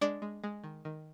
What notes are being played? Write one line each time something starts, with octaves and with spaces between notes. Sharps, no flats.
G#3 D4 D5
G#3
G#3
D#3
D#3